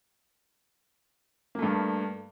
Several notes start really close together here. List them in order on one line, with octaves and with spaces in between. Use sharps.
A#3 A3 G2